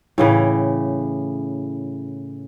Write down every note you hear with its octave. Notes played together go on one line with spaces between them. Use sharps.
A2 C#3 E3